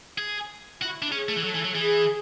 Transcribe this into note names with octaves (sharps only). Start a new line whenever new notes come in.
G#4
E4 F#4
D4
C#4 G#4
A3
E3
F#3 A4
E3
F#3
E3 G#4